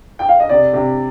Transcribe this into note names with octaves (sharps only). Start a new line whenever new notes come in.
G5
F5
D#5
C3 D5
C3